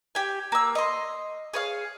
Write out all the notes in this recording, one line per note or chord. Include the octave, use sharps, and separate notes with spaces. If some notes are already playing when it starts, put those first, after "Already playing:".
G4 G#5
A#3 E6
D#5 C6
G#4 C#5 F5